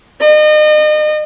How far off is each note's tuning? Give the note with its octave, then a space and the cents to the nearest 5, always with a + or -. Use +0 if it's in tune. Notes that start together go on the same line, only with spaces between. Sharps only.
D#5 -35